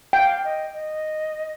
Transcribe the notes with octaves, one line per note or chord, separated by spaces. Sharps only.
F5 G5
D#5
D#5